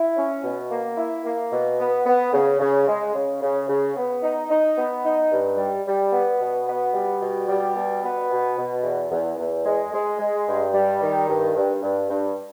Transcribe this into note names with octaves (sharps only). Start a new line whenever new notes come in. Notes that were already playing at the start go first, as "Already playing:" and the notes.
Already playing: E4
C#4
B2
A#3
E4
A#3
B2
B3
B3
C#3
C#3
G#3
C#3
C#3
C#3
B3
D#4
D#4
B3
D#4
G2
G3
G3
B3
B2
B3
G3
B2
G3
B2
B3
B2
B2
E2
E2
E2
G#3
G#3
G#3
G2
G3
D#3
G2
G2
G2
G2